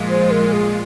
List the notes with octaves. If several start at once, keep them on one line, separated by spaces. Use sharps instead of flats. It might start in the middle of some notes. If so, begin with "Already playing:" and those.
Already playing: A#2 F3 G#3 F4
C5
A#4
G#4